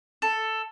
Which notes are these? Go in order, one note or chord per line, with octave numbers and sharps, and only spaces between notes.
A4